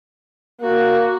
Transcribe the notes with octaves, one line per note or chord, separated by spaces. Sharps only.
A#3 F#4